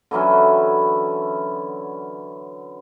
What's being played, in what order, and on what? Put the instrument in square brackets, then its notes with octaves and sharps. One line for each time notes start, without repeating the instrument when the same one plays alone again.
[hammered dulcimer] D3 E3 F#3 C#4